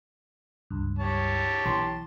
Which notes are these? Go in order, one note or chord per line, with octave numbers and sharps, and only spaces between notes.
C#2 G2
G4 C#5 A5
B1 E3 C6